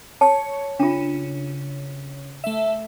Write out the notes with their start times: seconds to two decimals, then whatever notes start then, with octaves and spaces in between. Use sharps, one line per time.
0.21 C#5 A5
0.80 C#3 D4 F4
2.44 A3 E5